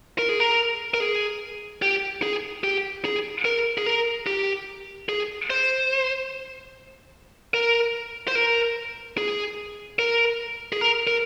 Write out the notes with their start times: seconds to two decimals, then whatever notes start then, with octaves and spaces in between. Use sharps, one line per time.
0.19 A#4
0.29 G#4
0.40 A#4
0.94 A#4
1.00 G#4
1.82 G4
2.23 G#4
2.64 G4
3.05 G#4
3.45 A#4
3.78 G#4
3.86 A#4
4.27 G4
5.09 G#4
5.50 C5
7.54 A#4
8.28 C5
8.35 A#4
9.18 G#4
9.99 A#4
10.73 G#4
10.81 A#4
11.07 A#4